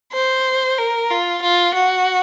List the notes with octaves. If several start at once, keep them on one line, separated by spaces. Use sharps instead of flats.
C5
A#4
F4
F4
F#4